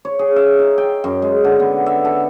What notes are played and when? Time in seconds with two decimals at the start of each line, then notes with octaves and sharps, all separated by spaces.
0.05 C#5
0.19 G#4
0.36 E5
0.59 D#4
0.78 G5
1.04 F#2
1.22 G#3
1.44 D3
1.60 B3
1.86 E5
2.05 A4